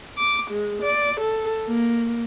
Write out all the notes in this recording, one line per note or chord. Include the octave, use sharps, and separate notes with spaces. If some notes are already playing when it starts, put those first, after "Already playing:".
D6
G#3
D5
A4
A#3